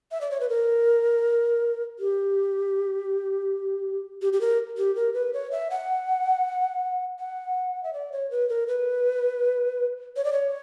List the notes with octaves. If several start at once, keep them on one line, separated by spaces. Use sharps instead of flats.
E5
D5
C#5
B4
A#4
G4
G4
G4
A#4
G4
A#4
B4
C#5
E5
F#5
F#5
E5
D5
C#5
B4
A#4
B4
C#5
D5
C#5